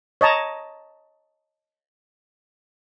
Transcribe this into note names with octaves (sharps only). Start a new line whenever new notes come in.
C#5 D#5 A5 A#5